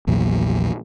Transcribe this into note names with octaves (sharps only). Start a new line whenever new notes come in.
A#1 E2 A#2 F#3